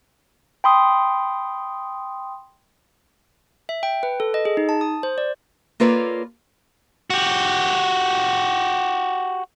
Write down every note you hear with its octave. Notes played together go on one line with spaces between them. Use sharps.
G5 B5 C6 D#6
E5
G5
B4
A4
D#5
G#4
D#4
A5
D#6
C5
D5
A#3 F4 A4 B4 C#5 D5
F#4 G4